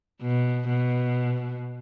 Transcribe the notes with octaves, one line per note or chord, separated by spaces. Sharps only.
B2
B2